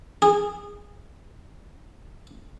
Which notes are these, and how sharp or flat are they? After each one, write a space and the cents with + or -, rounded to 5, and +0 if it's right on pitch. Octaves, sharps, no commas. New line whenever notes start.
G#4 -25